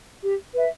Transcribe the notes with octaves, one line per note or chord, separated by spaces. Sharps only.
G4
B4 E5